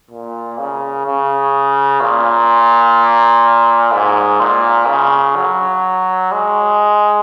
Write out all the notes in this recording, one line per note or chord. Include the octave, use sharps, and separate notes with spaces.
A#2
C#3
C#3
A#2
G#2
A#2
C#3
F#3
G#3